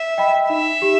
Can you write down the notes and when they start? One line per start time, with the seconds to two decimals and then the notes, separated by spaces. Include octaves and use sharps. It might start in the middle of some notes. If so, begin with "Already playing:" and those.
Already playing: E5
0.18 D#5 G5 B5
0.49 D#4 E5
0.82 G4